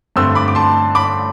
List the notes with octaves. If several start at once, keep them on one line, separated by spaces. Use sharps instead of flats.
G2 D3 A3 C4 C6 E6
B5 D6
D6
A5 C6
B5 D6